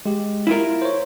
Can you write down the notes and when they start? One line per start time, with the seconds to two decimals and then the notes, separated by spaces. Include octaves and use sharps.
0.06 G#3 G4
0.47 E4 F4 A#4
0.82 C5 C#5